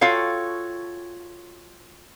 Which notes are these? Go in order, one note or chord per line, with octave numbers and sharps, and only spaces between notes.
F4 F#4 A4 C#5 F5 G5